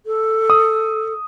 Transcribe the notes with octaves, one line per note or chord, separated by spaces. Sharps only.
A4
D#6